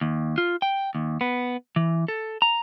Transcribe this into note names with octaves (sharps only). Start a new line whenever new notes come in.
D#2
F4
G5
D#2
B3
E3
A4
A#5